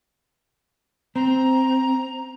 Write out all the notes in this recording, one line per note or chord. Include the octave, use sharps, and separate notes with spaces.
C4 A#5